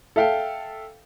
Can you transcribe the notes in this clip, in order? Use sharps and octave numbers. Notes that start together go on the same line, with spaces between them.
A4 E5 F5 G5